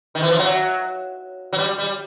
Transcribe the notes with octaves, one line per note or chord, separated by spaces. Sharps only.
D#3
E3
F3
F#3
F#3
G3
G3